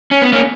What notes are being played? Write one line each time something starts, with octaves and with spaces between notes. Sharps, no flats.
C#4
B3
A#3 C#4